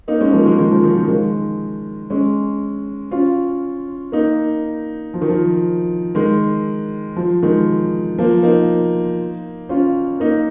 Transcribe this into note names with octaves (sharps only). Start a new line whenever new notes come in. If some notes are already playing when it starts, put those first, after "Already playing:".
A#3 D#4
G#3 C#4
F3 A#3
D#3 G#3
D#3 G#3
F3
D#3
F3
D#3 G#3
G#3 C#4
C#4 F4
A#3 D#4
F3
D#3
F3
D#3 G#3
F3
D#3 G#3
F3 A#3
A#3 D#4
C#4 F4
A#3 D#4